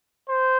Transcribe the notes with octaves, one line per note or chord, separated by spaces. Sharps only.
C5